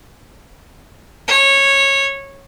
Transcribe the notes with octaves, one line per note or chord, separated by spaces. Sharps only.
C#5